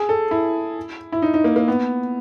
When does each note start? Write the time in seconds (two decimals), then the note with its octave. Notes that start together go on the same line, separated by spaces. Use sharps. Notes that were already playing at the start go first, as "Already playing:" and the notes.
Already playing: G#4
0.09 A4
0.31 E4
1.12 E4
1.22 D#4
1.34 D#4
1.44 A#3
1.56 A#3
1.68 B3